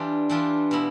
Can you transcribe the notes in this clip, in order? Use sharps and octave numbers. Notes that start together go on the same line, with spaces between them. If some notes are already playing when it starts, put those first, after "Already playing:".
Already playing: E3 G3 D4 F4
E3 G3 D4 F4
B2 B3 E4